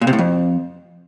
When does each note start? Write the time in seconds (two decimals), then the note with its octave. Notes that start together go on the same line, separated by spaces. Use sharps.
0.01 A#2
0.07 C3
0.13 A2
0.18 F2